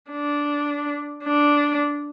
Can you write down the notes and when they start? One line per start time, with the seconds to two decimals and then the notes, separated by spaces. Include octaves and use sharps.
0.11 D4
1.24 D4